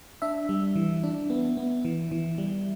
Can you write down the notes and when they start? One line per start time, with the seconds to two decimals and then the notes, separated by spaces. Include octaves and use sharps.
0.22 D4 E5
0.49 G3
0.76 E3
1.03 D4
1.30 B3
1.57 B3
1.85 E3
2.11 E3
2.38 G3